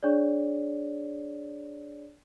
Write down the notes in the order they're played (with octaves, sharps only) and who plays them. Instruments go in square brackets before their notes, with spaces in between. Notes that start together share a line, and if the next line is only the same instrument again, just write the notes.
[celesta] D4 G#4 C#5 D5